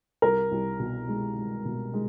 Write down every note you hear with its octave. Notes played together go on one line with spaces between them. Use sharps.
C2 A#4
C2
B2
G#3
G#3
B2
G#3